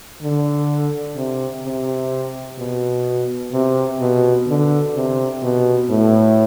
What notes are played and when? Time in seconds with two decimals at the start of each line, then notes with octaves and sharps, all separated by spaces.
0.22 D3
1.16 C3
1.64 C3
2.59 B2
3.53 C3
4.01 B2
4.47 D3
4.95 C3
5.43 B2
5.90 A2